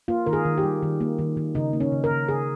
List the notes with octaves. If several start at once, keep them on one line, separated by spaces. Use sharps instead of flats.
A#3 F4
D#3 A#4
G#4
D#3
G4
G3
D#3
A#3
D#3
D#3
C#3 D#4
A#3
C#4
C#3
A#4
C#3
C#3 G#4